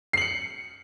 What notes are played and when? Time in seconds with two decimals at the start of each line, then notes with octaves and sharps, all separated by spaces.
0.13 C7
0.17 F#7
0.22 C#7